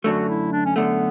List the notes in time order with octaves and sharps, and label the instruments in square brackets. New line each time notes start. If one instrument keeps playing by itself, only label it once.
[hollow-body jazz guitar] F#2 D3 A3 [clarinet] F#4
[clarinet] E4
D4
C#4
[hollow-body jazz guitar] F#2 D3 A3 [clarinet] B3